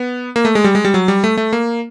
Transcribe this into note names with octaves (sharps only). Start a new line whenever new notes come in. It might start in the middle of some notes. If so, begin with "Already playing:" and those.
Already playing: B3
A#3
A3
G#3
G3
G#3
G3
F#3
G3
A3
A3
A#3